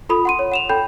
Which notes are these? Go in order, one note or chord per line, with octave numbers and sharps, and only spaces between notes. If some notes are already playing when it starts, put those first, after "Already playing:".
F4 A4 B5 D#6
F#5 C6 D#7
C#5
F#5 E7 F7
A4 G5 B5 G6